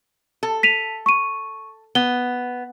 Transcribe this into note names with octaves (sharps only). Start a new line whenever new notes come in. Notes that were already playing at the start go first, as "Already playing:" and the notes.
A4
B6 D#7 F7
C#6 D#7
B3 G7